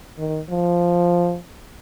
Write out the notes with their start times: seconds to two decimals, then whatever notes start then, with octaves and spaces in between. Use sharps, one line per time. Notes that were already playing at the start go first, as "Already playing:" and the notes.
0.18 D#3
0.50 F3